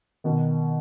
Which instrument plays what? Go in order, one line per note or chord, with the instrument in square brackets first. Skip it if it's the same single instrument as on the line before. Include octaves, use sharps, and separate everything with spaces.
[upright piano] B2 D#3